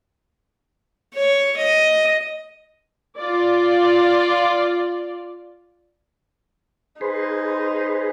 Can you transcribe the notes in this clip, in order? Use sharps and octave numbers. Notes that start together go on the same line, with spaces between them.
C#5
D#5
F4 D5
D#4 G#4 B4 C5